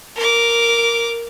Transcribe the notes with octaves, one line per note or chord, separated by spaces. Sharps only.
A#4 D6